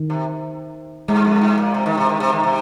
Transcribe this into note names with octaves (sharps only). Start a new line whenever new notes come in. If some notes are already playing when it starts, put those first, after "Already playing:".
Already playing: D#3
C3
G#2 G#3
F2
G#2
A#2
C3
D#3
C3
D#3
C3
D#3
C3